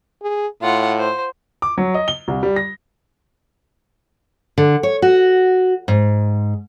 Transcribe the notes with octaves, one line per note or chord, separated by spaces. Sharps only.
G#4
A2 F4 F#5
C5
D6
F#3
D#5
G7
C2
G3
A#6
D3
C#5
F#4
G#2